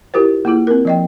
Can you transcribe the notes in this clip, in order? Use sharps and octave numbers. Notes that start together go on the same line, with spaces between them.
E4 F4 G4 A#4 C5
A#3 E4 F4 G#4
C4 A#4
F3 D#5 G5